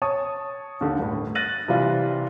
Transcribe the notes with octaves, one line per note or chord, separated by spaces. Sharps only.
C#5 A5 C#6 D#6
D#2 D3
G1 A2
F#6 A6 A#6 D#7 F#7
C3 E3 G3 F4